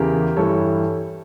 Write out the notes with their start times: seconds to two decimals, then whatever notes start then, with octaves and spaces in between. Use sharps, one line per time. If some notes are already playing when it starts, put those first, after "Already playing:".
Already playing: E2 C#3 E3 G4 A#4
0.37 G2 E3 A4 C#5